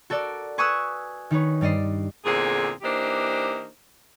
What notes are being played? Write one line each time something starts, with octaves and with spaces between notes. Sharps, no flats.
F#4 A4 A#4 D5
B4 G#5 C#6 D#6 E6 F#6
D#3 D#4 B4 C#5
G2 G3 D5 D#5 C7
E2 A#2 D3 C4 G#4
E3 A#3 D4 D#4 G4 C5